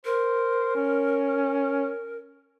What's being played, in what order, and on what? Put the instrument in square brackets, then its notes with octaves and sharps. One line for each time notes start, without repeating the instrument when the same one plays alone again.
[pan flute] A#4 [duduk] C5
[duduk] C#4